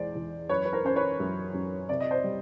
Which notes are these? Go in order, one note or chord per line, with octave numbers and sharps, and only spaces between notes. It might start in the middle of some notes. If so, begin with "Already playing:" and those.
Already playing: E2 G#3 C5 D5
E2
F#2 B4 C#5
B4
A#4 C5
C#4 C5
B4 C#5
F#2
F#2
C3 D5
D#5
C5 D5
G3